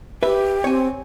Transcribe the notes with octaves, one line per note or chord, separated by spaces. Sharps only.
G4 B4 E5
C4 C#5 G#5